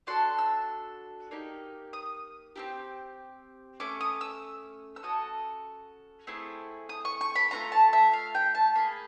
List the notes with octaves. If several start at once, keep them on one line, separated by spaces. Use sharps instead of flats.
D4 F#4 A4 C6
E6
A#3 D#4 G4
D#6
C4 E4 G4
A3 C#4 D6
D#6
E6
E6
C#4 F#4 A4 D#6
A3 C4 E4 G#4
D#6
C#6
C#6
B5
A3 C#4 F4 A#5
A5
E5
F5
G5
A5
A#3 D#4 G#4 B5